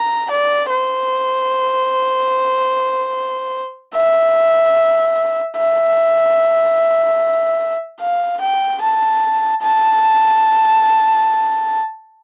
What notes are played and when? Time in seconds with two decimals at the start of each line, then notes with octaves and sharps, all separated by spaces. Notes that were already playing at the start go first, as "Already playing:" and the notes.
Already playing: A#5
0.31 D5
0.70 C5
3.95 E5
5.57 E5
8.01 F5
8.41 G5
8.82 A5
9.62 A5